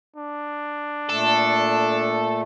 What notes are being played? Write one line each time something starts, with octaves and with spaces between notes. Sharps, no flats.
D4
A#2 A3 A4